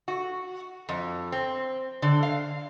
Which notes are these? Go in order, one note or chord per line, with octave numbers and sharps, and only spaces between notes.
F#4
F2
C4
D3
F5